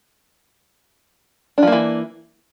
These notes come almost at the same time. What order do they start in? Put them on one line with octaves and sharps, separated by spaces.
D4 F3 A#3 E3